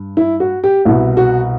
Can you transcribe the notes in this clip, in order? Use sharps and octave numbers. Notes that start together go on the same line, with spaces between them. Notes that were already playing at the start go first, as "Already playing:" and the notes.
Already playing: G2
E4
F#4
G4
C2 B2 E4
F#4